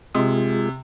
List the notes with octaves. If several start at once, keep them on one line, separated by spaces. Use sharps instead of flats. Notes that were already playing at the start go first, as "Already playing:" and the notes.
C3 G#3 F4 G#4